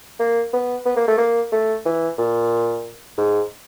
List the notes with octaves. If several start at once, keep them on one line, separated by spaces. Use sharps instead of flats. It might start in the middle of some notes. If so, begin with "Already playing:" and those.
A#3
B3
B3
A#3
A3
A#3
A3
E3
A#2
G#2